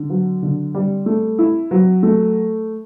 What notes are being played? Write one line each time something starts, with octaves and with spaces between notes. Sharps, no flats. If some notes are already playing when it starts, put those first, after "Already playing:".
Already playing: D3
F#3
D3
G3
A3
E4
F#3
A3